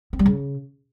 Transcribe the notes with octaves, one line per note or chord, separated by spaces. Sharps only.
C4
G3
C#3